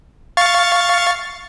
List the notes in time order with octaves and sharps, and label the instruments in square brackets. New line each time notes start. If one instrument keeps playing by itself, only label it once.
[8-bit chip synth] F5 C#6 A6